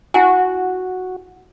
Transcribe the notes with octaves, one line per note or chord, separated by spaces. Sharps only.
E4 F#4 F#5 G#5